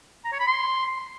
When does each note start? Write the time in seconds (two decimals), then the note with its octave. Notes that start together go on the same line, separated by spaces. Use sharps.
0.25 A#5
0.32 C#5
0.40 B5
0.47 C6